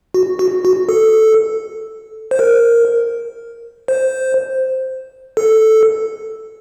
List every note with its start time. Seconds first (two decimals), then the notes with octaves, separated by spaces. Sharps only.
0.14 F#4
0.39 F#4
0.65 F#4
0.89 A4
2.31 C5
2.39 A#4
3.88 C5
5.37 A4